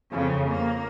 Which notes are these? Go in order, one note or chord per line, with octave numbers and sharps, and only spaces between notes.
F2 C#3
A#3